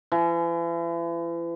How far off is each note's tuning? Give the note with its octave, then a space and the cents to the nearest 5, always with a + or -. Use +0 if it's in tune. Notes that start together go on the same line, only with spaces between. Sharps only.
E3 +40